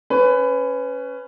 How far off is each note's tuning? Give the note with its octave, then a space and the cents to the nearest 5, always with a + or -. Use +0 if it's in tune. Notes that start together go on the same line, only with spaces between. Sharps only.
C#4 +0 B4 +20